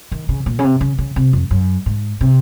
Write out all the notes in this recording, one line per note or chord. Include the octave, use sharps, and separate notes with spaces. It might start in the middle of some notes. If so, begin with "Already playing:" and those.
D#3
C#3
A#2
C#3
C3
C#3
C#3
C3
F2
F#2
G#2
C3